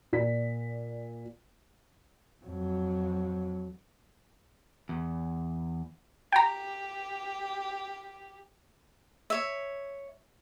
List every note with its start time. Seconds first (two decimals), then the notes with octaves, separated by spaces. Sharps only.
0.13 A#2 D5 B6
2.45 F2 F#3
4.89 E2
6.32 G4 G5 A#5
9.30 C#5 E5